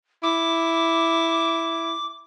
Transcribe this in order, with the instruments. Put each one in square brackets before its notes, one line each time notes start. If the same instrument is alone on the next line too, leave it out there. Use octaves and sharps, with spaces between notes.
[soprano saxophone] E4 [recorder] D6